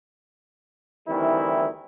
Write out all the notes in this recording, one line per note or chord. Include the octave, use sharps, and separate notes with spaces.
D2 D#3 E3 G3 C4 E4